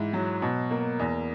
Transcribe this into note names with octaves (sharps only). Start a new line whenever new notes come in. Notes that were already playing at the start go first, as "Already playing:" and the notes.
Already playing: G#2 E3 E5
F#3
B2
A#3
E2